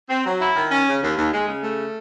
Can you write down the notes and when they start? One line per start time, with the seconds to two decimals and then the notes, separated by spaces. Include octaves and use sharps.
0.09 C4
0.25 F#3
0.40 E4
0.56 D#3
0.71 C#4
0.87 C#3
1.02 D#2
1.17 D#2
1.32 G#3
1.47 C#3
1.63 A3